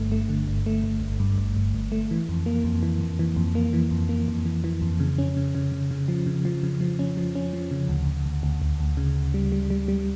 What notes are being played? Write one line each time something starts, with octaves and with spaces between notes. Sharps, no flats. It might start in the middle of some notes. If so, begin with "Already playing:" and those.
Already playing: G1 G2 D3 A3
A3
D3
G1
A3
G1
G1
G2
G1
G1
G1
A3
E3
F2
A#3
F2
E3
F2
E3
F2
A#3
E3
F2
A#3
F2
E3
E3
F2
C#3
C#4
C#3
C#3
C#3
C#3
F3
C#3
F3
C#3
F3
C#4
F3
C#4
F3
C#3
D2
D2
D2
D2
D2
D2
C#3
D2
G3
G3
G3
G3